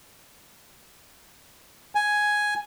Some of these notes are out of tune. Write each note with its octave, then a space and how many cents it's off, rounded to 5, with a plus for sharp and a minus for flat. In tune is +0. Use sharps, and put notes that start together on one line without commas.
G#5 +5